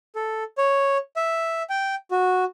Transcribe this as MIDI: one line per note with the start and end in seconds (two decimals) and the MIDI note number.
0.15 0.44 69
0.58 0.97 73
1.16 1.62 76
1.70 1.95 79
2.11 2.44 66